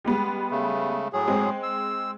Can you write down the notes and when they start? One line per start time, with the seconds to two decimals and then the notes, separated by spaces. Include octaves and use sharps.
0.05 G3 G#3 B3
0.51 C#3 A3
1.13 A2 F#3 G#4
1.28 G#3 C4
1.63 E6